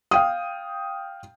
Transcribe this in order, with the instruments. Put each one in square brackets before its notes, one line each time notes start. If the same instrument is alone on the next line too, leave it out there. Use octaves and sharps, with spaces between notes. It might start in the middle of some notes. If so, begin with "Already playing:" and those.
[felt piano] F5 G5 D#6